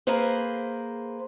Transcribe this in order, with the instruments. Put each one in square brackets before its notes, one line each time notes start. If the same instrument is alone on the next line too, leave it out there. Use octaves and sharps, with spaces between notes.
[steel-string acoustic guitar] A#3 G#4 B4 C5